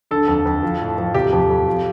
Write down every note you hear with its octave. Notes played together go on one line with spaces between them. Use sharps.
D3 A4
F2
F2
F3
A2
F3
C3 G4
F2
F2
F3